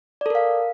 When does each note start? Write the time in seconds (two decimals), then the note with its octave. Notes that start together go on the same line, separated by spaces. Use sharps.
0.21 D5
0.26 A4
0.30 A#4
0.35 F5